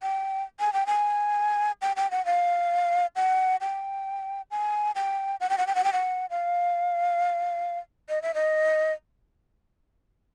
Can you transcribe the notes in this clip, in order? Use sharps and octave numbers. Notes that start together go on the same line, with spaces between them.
G5
G#5
G5
G#5
G5
G5
F#5
F5
F#5
G5
G#5
G5
F#5
G5
F#5
G5
F#5
G5
F#5
F5
D#5
E5
D#5